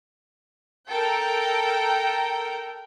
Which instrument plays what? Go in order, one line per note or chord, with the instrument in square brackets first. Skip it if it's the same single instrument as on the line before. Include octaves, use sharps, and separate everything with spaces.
[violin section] A4 A#4 G5